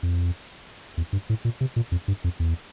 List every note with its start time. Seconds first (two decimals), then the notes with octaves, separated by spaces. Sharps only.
0.03 F2
0.97 E2
1.13 G2
1.29 A2
1.45 A#2
1.61 C3
1.76 A#2
1.92 F2
2.08 G2
2.24 F2
2.40 E2